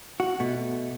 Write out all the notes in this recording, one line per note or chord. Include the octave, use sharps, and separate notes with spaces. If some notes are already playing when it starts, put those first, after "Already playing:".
F#4
B2 A3